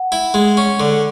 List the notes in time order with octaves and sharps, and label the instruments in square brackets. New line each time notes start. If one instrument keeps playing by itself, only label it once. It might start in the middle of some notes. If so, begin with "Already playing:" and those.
Already playing: [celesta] F#5
[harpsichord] E4
G#3
C#4
D3